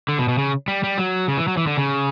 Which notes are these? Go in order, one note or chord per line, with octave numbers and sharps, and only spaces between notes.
D3
B2
B2
C#3
G3
G3
F#3
C#3
E3
F#3
E3
D3
C#3